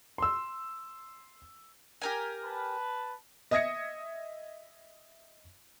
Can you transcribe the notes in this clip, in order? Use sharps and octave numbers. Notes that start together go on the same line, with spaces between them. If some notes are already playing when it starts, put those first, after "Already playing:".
C6 E6
G4 A#4 G#5
B4 A5
D#5 E5 D#6 G#6 A#6 C#7